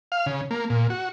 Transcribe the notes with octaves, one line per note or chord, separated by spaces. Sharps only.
F5
C#3
A#3
A#2
F#4